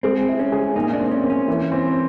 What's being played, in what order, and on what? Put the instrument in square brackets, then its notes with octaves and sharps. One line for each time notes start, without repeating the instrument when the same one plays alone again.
[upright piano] G#3 [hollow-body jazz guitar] C4
[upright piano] E4
[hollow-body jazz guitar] C#4
[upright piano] G#4
[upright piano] A#2 [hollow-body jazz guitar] D#4
[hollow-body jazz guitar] D4
[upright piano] C4
[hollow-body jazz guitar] C#4
[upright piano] A#2
[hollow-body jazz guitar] C#4
[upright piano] E3
C4